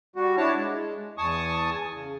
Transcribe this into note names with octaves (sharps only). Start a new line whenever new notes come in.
G3 F#4
D4 E4 C#5 A5
G#3
E2 G#5 A5 C#6 D#6
C#3